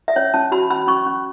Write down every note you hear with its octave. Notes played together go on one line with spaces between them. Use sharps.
E5
C#4 C#5
C#4 A5
F#4 B5
C#4 B5
C#4 C#6
C#4